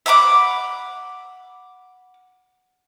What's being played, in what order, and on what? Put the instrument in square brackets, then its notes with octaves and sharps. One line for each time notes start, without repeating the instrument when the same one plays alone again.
[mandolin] E5 F#5 B5 D6